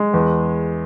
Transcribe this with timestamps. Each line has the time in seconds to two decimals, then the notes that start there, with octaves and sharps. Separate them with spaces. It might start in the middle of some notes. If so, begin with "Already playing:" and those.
Already playing: G#3
0.14 E2